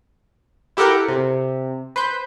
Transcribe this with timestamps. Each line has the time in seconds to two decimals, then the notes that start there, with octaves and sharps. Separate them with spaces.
0.77 E4 G4 A4 A#4 F#5 G5
1.08 C3
1.96 B4 C5 G6